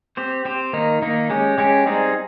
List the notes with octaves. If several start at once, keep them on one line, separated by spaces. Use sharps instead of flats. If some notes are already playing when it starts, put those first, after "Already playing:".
C4 G4 C5
C4 G4 C5
D#3 A#3 D#4
D#3 A#3 D#4
G#3 C#4 G4
G#3 C#4 G4
G3 C4 D#4 G#4